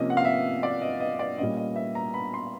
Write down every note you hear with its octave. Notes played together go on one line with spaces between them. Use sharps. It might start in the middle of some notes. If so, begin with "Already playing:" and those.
Already playing: C3 F3 A#3 C#4 D#5
F#5
F5
E5
D5
D#5
D#5
D5
A#2 G3 A#3 C#4 D#5
D#5
E5
A#5
B5
C6